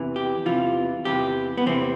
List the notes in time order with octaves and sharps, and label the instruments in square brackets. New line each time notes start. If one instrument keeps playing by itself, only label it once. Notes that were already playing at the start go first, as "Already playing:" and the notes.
Already playing: [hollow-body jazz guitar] E2 C3 E3
G4
E2 C3 E3 F4
E2 C3 E3 G4
B3
E2 C3 E3 C4